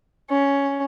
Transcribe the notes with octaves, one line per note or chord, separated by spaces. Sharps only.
C#4